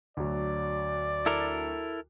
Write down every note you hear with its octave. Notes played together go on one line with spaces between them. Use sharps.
D2 F#3 D5
E4 A4 A#4